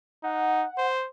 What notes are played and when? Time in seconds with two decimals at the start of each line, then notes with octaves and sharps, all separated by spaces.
0.24 D#4 F#5
0.78 C5